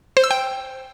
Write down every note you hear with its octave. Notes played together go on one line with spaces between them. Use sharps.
C5
E6
G5